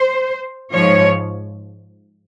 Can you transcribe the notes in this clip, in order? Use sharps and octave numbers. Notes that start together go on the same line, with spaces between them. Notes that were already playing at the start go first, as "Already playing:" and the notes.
Already playing: C5
G#2 F3 C#5